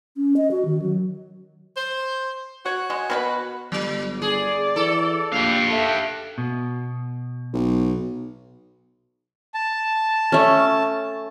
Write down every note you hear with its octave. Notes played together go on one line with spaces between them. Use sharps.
C#4
D#5
F#4
D#3
F#3
C5
F#4 C#5
G#3
B2 C#4 B4
G1 F#3
G#4 D5
E3 A4
A#1 G4 F5
A4 E5
B2
B1
A5
A3 C#4